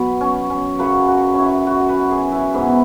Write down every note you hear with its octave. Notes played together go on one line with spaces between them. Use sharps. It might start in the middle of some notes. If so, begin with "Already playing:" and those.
Already playing: B2 F#3 B4
C#4
C#4
F#2 C#3 F#3 B4
F#4
C#4 E4
F#4
B4
G#4
E4
G#2 E3 B3